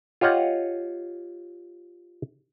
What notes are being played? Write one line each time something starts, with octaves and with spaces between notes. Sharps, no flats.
F4 G4 C#5 D#5 F#5